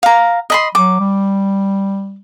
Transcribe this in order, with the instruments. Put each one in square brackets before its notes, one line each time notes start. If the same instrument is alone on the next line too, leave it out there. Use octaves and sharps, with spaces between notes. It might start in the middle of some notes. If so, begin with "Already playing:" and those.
[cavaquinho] F5 A#5
D#5 B5 C6
[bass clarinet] F#3 [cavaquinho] D6
[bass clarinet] G3